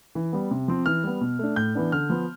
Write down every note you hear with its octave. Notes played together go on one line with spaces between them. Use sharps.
E3
G3 B3
C3
F3 C4
E3 F6
G3 B3
B2
A3 D4
A2 G6
E3 B3 D4
D3 F6
F3 B3